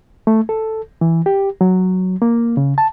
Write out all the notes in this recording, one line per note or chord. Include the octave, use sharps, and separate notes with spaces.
A3
A4
E3
G4
F#3
A#3
C#3
A5